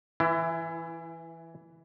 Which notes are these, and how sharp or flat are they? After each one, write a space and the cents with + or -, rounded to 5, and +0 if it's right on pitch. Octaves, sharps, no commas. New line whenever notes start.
E3 +0 E4 +30